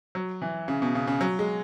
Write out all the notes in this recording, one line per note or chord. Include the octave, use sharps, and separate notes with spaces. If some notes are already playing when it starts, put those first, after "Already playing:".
F#3
E3
C#3
B2
C#3
C#3
F#3
G#3